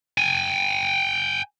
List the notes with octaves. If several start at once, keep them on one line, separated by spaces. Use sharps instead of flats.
G5 G#5